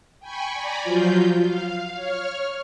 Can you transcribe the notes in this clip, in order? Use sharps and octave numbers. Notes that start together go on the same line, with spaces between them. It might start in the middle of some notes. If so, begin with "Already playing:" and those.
G5 G#5 B5 C#6
D5 G#5 A#5 B5
F3 F#3 F4 G6
F5
C#5 F6